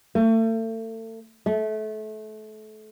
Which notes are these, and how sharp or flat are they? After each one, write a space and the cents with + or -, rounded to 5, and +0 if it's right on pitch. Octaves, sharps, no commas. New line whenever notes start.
A3 +35
A3 -30